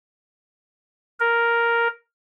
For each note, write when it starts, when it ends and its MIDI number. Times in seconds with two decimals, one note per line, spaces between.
1.20 1.87 70